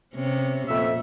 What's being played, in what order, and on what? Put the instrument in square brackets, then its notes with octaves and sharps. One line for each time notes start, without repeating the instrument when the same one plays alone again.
[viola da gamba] C3 B3 C#4
[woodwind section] F2 E5 [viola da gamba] A#2 A3